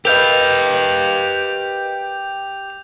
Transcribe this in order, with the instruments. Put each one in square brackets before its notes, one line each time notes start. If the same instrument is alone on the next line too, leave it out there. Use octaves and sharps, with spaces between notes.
[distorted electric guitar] G4 F5 [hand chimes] A#4 B4 D#5 [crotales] G6 F7